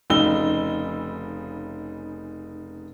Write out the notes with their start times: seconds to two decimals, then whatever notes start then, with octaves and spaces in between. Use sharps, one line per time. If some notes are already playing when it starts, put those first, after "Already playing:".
0.10 F1 C#3 D#4 E6 G7